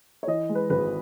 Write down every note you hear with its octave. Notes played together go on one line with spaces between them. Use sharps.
C#5
E3 D#5
G#3
B4
G#1 B4